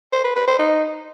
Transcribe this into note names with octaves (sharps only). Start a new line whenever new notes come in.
C5
B4
B4
C5
D#4